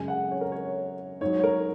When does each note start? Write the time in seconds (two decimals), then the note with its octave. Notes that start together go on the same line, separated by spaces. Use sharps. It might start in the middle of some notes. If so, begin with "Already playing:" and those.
Already playing: F#2 C#3 G#3 G#5
0.08 F#5
0.31 C#5
0.41 A#4
0.52 C#5
1.21 G#2 F#3 C#5
1.40 C#5
1.43 A#4